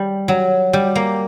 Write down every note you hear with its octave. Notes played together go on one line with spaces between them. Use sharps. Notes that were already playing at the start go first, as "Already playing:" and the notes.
Already playing: G3
F#3
G3
A#3